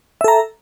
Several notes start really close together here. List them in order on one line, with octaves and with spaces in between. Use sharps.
E5 A4 A#5